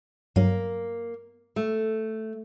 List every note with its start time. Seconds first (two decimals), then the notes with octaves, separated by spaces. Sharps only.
0.36 G2 F#3 A#3
1.56 A3